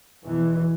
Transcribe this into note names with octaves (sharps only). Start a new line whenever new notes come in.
E2 B2 E3